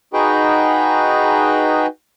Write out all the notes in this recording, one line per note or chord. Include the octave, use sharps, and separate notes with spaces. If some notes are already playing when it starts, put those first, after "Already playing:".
D#4 F#4 G#4 B4 G5